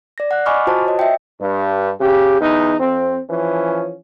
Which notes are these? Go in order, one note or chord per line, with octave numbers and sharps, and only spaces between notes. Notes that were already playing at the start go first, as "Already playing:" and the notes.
D5 A#6
F#5 F#6
D#5 G#5 B5 C#6 D6 F6
F4 F#4 C5 A5
C#5 D#5
E5 G5
G2
C#3 G4
E2 D#4
F2 C4
E3 F3 C#4